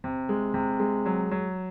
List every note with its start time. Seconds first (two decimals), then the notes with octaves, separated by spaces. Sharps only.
0.04 C3
0.29 G#3
0.54 C3
0.79 G#3
1.06 F#3
1.31 F#3